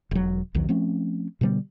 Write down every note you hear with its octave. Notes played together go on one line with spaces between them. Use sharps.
E1 F#3
B1 E2 D#3 F#3
F3 A3 C4 C#4
B2 D3 G3 B3